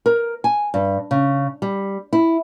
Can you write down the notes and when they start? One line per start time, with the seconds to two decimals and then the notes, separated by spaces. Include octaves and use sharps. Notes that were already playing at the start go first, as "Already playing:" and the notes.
0.06 A#4
0.44 G#5
0.74 G2
1.11 C#3
1.62 G3
2.13 E4